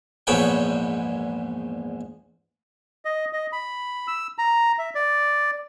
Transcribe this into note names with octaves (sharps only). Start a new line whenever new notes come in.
A#1 E2 G#2 B4 C#5 G5
D#5
D#5
B5
E6
A#5
E5
D5